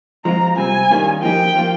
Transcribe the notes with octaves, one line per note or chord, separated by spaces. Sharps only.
F3 G#3 C4 F4 A#5
C3 G3 C4 G#5
D#3 G3 A#3 C#4 F4
F3 A#3 D#4 G4 G5
F3 A#3 F4